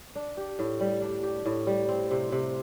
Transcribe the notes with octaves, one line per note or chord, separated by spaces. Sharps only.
D4
G4
A2
G3
D4
G4
A2
G3
C4
C3
C3